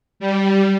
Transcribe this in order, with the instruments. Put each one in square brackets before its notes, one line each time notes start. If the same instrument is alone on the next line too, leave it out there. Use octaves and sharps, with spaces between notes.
[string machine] G3